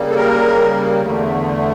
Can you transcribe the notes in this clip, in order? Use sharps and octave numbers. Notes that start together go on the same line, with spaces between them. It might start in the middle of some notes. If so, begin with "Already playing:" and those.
Already playing: C#3 G3 A#3
A4
A#4
E2 D3 A3